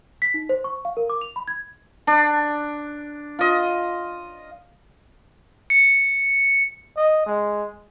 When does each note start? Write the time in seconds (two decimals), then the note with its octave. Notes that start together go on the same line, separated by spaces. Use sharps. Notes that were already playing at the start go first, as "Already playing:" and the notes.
0.22 B6
0.34 D#4
0.49 C5
0.64 C#6
0.85 F5
0.97 A#4
1.10 D6
1.21 F7
1.36 B5
1.48 G#6
2.07 D4
3.39 F4 D#5
5.70 C#7
6.97 D#5
7.26 G#3